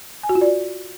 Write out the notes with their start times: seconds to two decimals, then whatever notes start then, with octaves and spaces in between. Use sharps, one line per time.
0.23 G#5
0.29 F#4
0.35 F4
0.41 D5